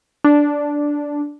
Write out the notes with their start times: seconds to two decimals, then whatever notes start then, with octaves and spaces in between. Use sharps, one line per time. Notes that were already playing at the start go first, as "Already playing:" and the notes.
0.24 D4